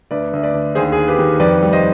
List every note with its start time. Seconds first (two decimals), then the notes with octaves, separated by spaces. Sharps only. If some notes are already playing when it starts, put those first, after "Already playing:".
0.11 D2 B4 D5
0.33 D2
0.43 B4 D5
0.54 D3
0.75 D#2 G#4 C5
0.92 G#4
0.97 D#2
1.08 G4 B4
1.19 D#3
1.40 F2 B4 D5
1.63 G3
1.73 C5 D#5